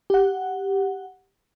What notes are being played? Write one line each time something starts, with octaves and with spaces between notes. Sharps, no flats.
G4 F#5